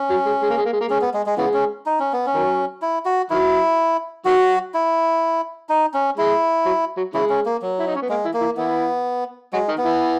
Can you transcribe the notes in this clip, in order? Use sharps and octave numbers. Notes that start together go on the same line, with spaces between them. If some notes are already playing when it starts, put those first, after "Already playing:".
Already playing: C#4
F#3
G#3
G#3
A#3
G#3
A#3
G#3
A#3
G#3 C#4
B3
G#3
G#3
C#3 E3 G#3 B3
C#4
D#4
C#4
B3
C#4
D#3 F#3
E4
F#4
D#3 F#3 E4
D#3 F#3 F#4
E4
D#4
C#4
G#3 E4
F#3
F#3
C#3 E3 G#3 E4
C#4
A#3
F#3
E4
D#4
C#4
B3
G#3 A#3
E3 E4
A#3
E3 E4
E3 B3 E4
F#3 G#3 F#4
D#3 D#4
B3
E3 E4